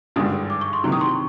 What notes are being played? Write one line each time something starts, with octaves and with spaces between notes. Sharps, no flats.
G#1 G2 D3 D#6
D6
C#6
C6
C3 D#3 F#3 C#6
D#6
C6
C#6